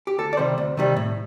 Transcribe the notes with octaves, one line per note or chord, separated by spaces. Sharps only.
G4
D2 A4
D5
C3 D#3 G3 C5
D2
C3 D#3 G3
A2